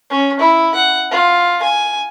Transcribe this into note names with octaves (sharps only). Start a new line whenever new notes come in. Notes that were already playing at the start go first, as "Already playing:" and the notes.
C#4
E4
F#5
F4
G#5